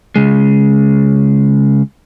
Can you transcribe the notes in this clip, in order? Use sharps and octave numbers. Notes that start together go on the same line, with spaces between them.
C#3 G#3